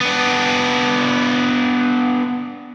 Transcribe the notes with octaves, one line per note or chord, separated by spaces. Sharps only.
B3 D4